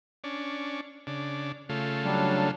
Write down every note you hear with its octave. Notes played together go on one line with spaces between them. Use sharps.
C#4 D4
C#3 D4
C#3 A3 F4
F#3 G3 D4